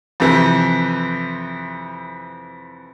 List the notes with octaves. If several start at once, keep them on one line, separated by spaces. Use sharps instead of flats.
F2 C3 E3